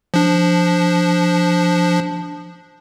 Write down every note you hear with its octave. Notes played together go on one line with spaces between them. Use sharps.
F3 D4